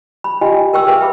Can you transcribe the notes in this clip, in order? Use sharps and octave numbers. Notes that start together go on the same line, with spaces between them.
B5
F4 G4 D#5 G5 G#5 C6
D#5
A#4 G5 C#6 E6
G#4 B4 E5 F5
A#4 E5 G5 B5 D6